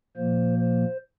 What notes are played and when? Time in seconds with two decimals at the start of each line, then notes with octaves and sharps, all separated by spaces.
0.17 A#2 F3 A#3 C5
0.59 C5